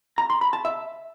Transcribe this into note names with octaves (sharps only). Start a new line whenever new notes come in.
A#5
C6
B5
A5
E5